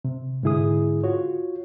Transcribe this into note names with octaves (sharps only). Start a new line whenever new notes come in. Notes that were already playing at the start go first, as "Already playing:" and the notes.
C3
G#2 D3 E4 G#4 D#6
F4 F#4 C#5